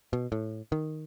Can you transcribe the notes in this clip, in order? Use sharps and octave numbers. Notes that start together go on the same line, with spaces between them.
B2
A2
D#3